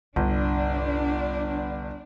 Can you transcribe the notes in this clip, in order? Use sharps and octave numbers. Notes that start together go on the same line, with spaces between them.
G1 C2 D4